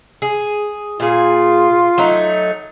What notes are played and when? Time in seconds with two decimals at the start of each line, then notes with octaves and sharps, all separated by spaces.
0.22 G#4
1.00 A#2 F4 G#4
1.98 F#3 A3 D#4